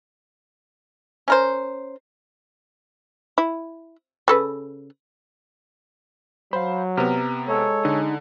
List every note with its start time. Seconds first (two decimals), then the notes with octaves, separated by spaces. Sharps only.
1.28 C#4 A#4 C5
3.38 E4
4.28 C#3 A4 B4
6.53 F#3 C5 F5 B5
6.97 C3 B3 A#5 F6
7.48 G#3 A4 C#5
7.85 D3 D#4 G#4